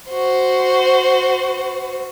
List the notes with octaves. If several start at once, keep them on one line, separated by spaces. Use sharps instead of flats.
F#4 C5